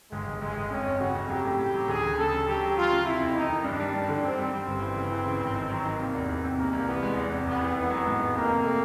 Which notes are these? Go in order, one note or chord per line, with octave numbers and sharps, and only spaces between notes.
G1 G#3
G1
G1 G#3
G1
F2 C#4
F2
C#3 F#4
F2
F#3 G4
A2
A2
F#3
D2 G#4
D2
C#3 A4
C#3
F#3 G4
F#3
F#3 F4
C#3
C3 E4
F2
F2 D#4
D#3
G2 D4
G3
G2
D3
F#2 C4
G3
G3 C4
G1
E3
C#3
E3
C#3
G#1
D#3
F#3
D#3
C3 A#3
E2
E2
C3
C2 A#3
C2
E3 B3
G#3
E2
C3
F1 B3
E3
D#3 B3
F#3
G#2
G#2
F2 A#3
C3
A3